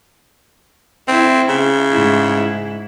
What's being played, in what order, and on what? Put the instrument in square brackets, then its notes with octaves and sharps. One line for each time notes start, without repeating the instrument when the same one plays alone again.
[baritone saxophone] C4 [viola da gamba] E4
[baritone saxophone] C#3
[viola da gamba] G#2 E4